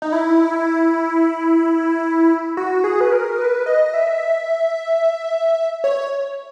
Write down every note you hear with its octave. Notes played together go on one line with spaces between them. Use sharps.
D#4
E4
F#4
G#4
B4
A#4
B4
D#5
E5
C#5